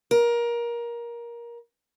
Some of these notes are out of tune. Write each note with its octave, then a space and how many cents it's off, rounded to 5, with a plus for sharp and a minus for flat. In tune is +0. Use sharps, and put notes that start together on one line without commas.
A#4 +20